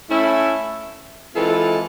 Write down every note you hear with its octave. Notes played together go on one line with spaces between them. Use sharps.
A3 C#4 E4
E3 G#3 C4 F4 A4